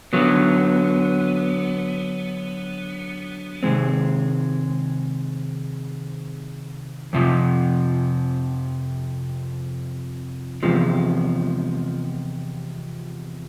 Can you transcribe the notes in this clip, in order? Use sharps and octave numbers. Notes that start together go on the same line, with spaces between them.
D3 F#3 B3
C3 D#3 G#3 C4
F2 C3 F3
E2 C3 F3 G#3